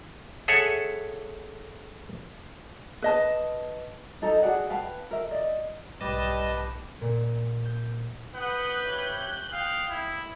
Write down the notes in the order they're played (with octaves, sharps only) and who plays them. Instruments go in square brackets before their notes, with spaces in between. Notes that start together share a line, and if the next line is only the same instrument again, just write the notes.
[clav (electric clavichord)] G#4 A4 C#5 E5 F#5
[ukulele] B4 D#5 A5
D#4 A4 D#5 A#5
F#4 G#4 D5 F#5
B4 F5 G5 A5
A#4 E5
D5 D#5
[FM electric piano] B1 G#2 [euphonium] G3 [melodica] G4 B4 [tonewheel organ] D#5 A5
[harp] A#2
G6
[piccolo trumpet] B4 [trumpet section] F#5 D#6 [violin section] F#6 G6
[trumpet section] G4 C#5 E5
[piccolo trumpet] F5 [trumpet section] G5 D#6
[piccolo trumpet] E4